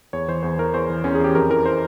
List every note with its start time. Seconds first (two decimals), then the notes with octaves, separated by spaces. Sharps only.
0.13 E2 C#5
0.28 E3 C5
0.43 E2 C5
0.59 E3 A#4
0.74 E2 C5
0.90 E3
1.04 E2 C#4
1.15 G#4
1.20 E3 G4
1.35 F2 A#4
1.50 E3 A#4
1.66 C5